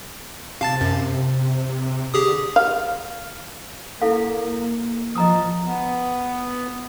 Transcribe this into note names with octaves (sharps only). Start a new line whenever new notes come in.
C3 F5 A5 A6
F#2
D3 G4 G#4 D#6
F5
A#3 E4 A4 F5
F3 D#5 A#5 D#6
B3